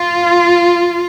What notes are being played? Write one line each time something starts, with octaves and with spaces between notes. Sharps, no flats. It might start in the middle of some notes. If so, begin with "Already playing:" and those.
Already playing: F4